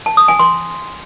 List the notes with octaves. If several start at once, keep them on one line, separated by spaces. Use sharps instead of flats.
A5
D#6
G#5
C6